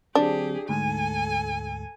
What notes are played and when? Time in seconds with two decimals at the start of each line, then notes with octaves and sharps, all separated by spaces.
0.15 D3 F#3 C4 D4 G4 G#4
0.69 D2 G#2 A4 G#5